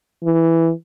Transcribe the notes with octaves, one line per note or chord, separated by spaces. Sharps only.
E3